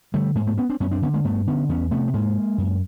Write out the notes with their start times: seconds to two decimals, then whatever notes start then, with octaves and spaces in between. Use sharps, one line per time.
0.14 D3 G3 A3
0.35 G#2 G#3 A#3
0.47 A3 B3
0.58 B3 C#4
0.69 C4 D4
0.80 F#2 B3 C#4
0.91 C4 D4
1.02 D3 B3 C#4
1.14 G#3 A#3
1.24 G2 A3 B3
1.47 D3 B3 C#4
1.69 E2 B3 C#4
1.91 C3 A3 B3
2.08 B3
2.14 G#2 G#3 A#3
2.58 F#2